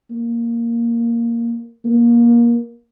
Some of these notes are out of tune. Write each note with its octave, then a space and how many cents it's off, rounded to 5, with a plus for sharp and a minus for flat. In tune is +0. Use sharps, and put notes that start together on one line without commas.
A#3 +0
A#3 +20